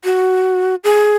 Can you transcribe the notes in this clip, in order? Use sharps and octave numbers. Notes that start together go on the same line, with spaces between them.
F#4
G#4